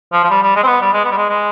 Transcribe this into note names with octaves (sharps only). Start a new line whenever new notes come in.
F3
F3
G3
G3
G#3
C4
B3
G3
G#3
B3
G3
G#3
G#3